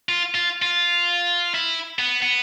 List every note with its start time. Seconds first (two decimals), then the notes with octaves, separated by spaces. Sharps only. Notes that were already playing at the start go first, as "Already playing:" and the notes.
0.09 F4
0.35 F4
0.62 F4
1.54 E4
1.99 B3
2.22 B3